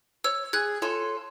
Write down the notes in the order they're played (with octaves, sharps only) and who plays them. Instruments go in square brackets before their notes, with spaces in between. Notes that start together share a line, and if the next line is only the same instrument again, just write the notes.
[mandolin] C#5 [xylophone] E6
[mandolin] G#4 [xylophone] F#6 G#6
[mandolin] F4 A4 C#5